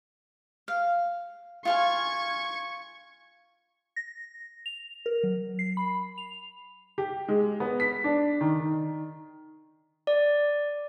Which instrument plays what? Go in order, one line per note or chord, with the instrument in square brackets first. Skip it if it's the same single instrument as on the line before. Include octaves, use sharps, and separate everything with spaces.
[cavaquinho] F5
[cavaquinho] F4 F5 G#5 [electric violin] C#6 G#6
[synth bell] A#6
F7
A#4
F#3
C7
B5
F7
[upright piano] G4
G#3
B3
B6
D4
D#3
D#3
[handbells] D5